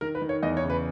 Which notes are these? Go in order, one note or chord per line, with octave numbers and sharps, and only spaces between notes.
D#3 A#4
B4
D#3
C#5
E2 D#5
C#5
C#3
B4